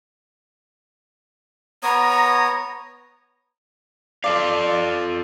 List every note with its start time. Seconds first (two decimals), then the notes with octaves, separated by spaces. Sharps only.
1.83 B3 C#5 A#5 D#6
4.24 F4 A4 D5 F5